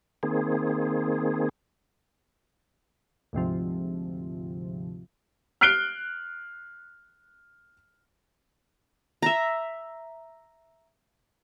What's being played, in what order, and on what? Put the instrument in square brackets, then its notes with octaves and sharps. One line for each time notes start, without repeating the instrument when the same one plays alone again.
[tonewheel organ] D#3 A#3 C4 G#4
[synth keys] D2 G#2 C3 F3
[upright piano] F6 F#6 C7 D7 G7
[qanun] E5 A#5